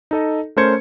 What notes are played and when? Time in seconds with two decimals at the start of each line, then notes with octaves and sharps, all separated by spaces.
0.11 D#4 A4 D#5
0.57 A3 C#4 A#4 C5 G#6 C#7